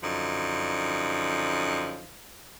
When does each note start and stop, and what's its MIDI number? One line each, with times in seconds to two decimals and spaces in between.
0.03 2.11 42
0.03 2.11 50
0.03 2.11 53
0.03 2.11 63